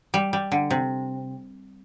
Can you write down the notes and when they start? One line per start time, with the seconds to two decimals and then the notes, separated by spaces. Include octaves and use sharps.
0.14 G3
0.33 G3
0.52 D3
0.71 C3